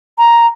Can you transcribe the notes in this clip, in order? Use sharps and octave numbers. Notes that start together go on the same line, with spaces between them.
A#5